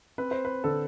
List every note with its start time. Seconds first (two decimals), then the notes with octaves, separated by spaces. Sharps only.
0.18 C4 B4
0.31 C5
0.45 B4
0.64 D3 A4